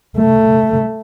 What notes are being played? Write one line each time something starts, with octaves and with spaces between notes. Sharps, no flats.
A3